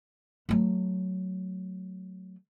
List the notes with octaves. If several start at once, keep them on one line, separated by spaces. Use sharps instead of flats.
F#3 A3